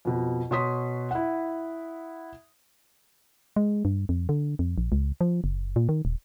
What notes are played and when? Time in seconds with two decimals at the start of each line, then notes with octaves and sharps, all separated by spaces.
0.05 F2 B2
0.51 B2 C#5 C6 D#6 B6
1.11 E4 F#5
3.56 G#3
3.85 G2
4.09 F2
4.29 D3
4.59 F2
4.78 A#1
4.92 C#2
5.21 F3
5.44 F#1
5.76 A#2
5.89 D#3
6.05 D#1